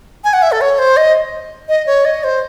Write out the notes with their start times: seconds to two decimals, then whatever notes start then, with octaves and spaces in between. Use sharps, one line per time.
0.24 G#5
0.33 F#5
0.42 E5
0.52 A4
0.61 C#5
0.79 C5
0.97 D#5
1.69 D#5
1.87 C#5
2.05 D#5
2.24 C5